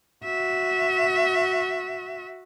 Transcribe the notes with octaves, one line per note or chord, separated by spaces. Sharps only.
F#4 E5